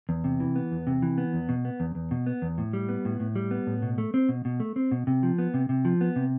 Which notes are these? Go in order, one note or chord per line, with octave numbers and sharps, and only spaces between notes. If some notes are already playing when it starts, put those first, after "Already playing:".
E2
C3
E3
B3
E2
C3
E3
B3
E2
B2
B3
E2
E2
B2
B3
E2
A2
G3
B3
A2
A2
G3
B3
A2
B2
A3
C4
B2
B2
A3
C4
B2
C3
F3
B3
C3
C3
F3
B3
C3